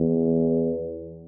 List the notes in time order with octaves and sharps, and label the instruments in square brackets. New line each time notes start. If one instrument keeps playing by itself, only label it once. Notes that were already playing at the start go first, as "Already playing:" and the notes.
Already playing: [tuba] E2